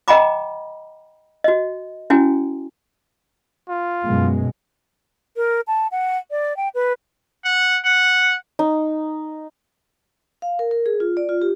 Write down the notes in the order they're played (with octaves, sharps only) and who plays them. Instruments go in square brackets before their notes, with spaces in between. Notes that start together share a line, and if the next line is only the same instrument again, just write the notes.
[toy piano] D#5 F#5 G5 A#5 B5 D6
F#4 D#5
C#4 E4 F#4 G#5
[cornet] F4
[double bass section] F#2 B2 G#3
[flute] A#4
A5
F#5
D5
G5
B4
[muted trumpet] F#5
F#5
[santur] D#4
[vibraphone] F5
A#4
A#4
G#4
F4
D5
F4
G4